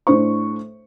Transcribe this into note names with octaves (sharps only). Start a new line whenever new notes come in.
A2 D4 C5 C#6